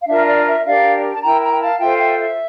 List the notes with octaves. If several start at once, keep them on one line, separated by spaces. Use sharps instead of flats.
F5
D4 F4 A#4 E5
D5
E5
D4 G4 A#4 D5 F5
A5
E4 A#4 G5 A#5
G5 A#5
G5
F5 A5
F4 A4 C5 E5 G5
E5 G5
E5